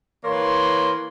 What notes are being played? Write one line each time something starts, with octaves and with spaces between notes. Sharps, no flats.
E3 A#3 C#5 C6